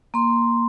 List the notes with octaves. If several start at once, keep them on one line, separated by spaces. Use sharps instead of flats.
A#3 C6